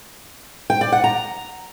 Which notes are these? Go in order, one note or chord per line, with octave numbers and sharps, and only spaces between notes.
G5
D5
F#5
A#5